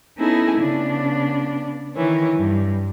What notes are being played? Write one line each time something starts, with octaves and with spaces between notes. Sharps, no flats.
B3 C#4 D#4 E4 G#4 A4
C#3 B3 D4
D#3 E3 C#5
G2